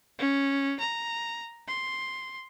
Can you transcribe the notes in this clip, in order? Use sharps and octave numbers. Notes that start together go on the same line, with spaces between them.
C#4
A#5
C6